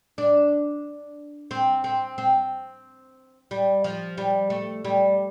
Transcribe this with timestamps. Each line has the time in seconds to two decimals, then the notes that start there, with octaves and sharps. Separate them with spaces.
0.18 D4
1.51 C4
1.84 C4
2.18 C4
3.51 G3
3.84 F3
4.18 G3
4.50 A3
4.85 G3